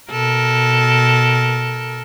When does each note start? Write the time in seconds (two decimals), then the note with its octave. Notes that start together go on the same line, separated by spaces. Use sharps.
0.11 B2 A4 A#4